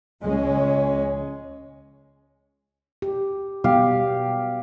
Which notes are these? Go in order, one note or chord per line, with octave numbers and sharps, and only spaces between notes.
C#2 G#3 C#4
G4
B2 G3 G4 F5